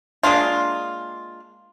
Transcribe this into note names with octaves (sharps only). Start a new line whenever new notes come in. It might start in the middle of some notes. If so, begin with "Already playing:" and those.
G#3 A#3 D4 F4